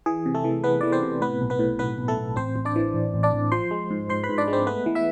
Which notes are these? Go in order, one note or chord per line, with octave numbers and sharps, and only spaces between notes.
E3 G#4
C3
A3 A4
E3
E3 B3 B4
E3 D5
C4 C5
C3
A2 B3 B4
B1
B3 B4
A2
B1 B3 B4
B1
A3 A4
B1
A1 C4 C5
A1
D4 D5
E3
A1
A1
D4 D5
A1
F3 C5 C6
G#3
G#2
G#2 C5 C6
B4 B5
G#2
D4 D5
G#3
C4 C5
A3 B3 B4
E3
E4 E5